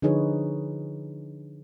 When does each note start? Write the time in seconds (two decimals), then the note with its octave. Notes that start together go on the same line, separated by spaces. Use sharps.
0.02 D3 F3 D#4 G#4 B4 C#5